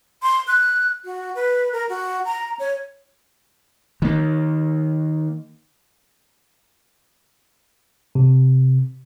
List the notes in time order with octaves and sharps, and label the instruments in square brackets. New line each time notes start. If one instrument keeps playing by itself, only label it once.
[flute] C6
F#6
F#4
B4
A#4
F#4
A#5
C#5
[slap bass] D#3 A#3
[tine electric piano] C3